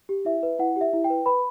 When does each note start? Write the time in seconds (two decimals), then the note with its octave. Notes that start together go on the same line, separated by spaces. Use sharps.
0.09 G4
0.25 E4 E5
0.43 B4
0.59 E4 F#5
0.76 G4
0.81 E5
0.93 E4
1.04 G5
1.10 B4
1.26 B4 B5